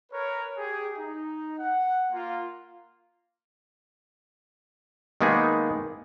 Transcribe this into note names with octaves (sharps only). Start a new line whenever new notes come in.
A#4 B4 C#5
G4 G#4
D#4
F#5
A#3 F4
D#3 G#3 A#3 B3 D#4 G#4